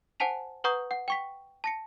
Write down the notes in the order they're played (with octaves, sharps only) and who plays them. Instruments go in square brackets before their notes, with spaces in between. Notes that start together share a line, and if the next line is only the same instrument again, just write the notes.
[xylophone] C5 F#5 G#5 A5 B6 F7
B4 F#5 A#5 C#6 D#6 G6
F#5
G5 C#6 B6
A5 A#6 C#7